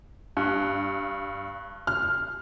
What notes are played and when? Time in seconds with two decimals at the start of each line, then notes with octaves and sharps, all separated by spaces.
0.37 G2
1.87 F6